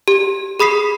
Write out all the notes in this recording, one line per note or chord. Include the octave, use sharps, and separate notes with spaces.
G4
G#4 B5 D#6 B6 C7